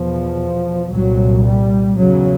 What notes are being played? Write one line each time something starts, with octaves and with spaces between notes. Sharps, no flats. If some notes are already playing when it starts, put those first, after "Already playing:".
Already playing: E2 B2 F3
C2 A#2 F#3
G3
E2 C#3 F#3